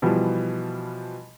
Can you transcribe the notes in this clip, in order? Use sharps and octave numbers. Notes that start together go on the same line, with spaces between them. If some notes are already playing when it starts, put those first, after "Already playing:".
B2 E3 F3 G3